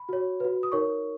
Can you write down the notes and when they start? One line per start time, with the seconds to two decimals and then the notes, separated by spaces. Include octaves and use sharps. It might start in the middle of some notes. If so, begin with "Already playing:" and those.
Already playing: B5
0.09 F#4 C#5
0.40 F#4 B4
0.63 D#6
0.72 D#4 A#4 C#5 C#6